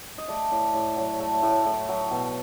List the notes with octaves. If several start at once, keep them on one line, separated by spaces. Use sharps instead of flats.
D#5
A3 D5
A2
A2
F#3
A3
A2
A2
F#3
B2